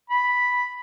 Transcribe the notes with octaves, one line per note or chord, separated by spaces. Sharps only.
B5